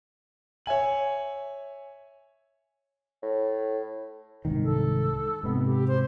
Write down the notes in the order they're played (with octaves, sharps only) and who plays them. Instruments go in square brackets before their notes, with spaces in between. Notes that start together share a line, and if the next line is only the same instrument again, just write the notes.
[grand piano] C#5 E5 G#5 F#7
[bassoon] A2
[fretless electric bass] C2 G#2 D#3
[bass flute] A4
[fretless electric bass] G#2 C3 [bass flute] B3
[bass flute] G4
C5